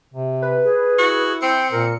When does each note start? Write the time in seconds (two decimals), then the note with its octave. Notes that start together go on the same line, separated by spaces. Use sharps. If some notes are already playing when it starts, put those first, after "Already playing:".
0.14 C3
0.42 B4
0.64 G#4
0.98 E4 F#4
1.42 C4 G5 C#7
1.72 A#2 A#4